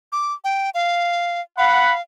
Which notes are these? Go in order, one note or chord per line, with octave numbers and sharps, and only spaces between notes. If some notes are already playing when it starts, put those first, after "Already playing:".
D6
G5
F5
F5 F#5 B5